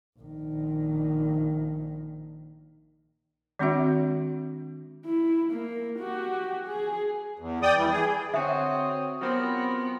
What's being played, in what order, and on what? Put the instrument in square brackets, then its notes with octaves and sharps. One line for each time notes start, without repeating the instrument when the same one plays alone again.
[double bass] A#1 D#3
[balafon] D#3 G#3 C4 D4 F#4 E5
[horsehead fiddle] E4
A#3
F#4 G4
G#4
[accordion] E2
D5 G5 D#6
E3 G3
G#4
[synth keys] D3 F#4 [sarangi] C4 [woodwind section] C#5 D#6 [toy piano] E5
[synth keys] F#3 C4 G4 [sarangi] B3 [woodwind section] F4 A#4